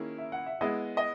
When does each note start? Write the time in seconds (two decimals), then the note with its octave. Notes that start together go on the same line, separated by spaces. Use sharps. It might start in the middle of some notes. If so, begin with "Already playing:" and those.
Already playing: D#3 A#3 C#4 E4 G#4
0.18 E5
0.32 F#5
0.46 E5
0.61 G#3 B3 E4 G#4 D#5
0.97 D#5